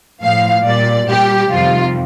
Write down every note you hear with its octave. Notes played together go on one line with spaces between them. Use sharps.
A2 F3 F5
A#2 G3 D5
A#2 G3 G4
F2 C3 D#3 G3 F4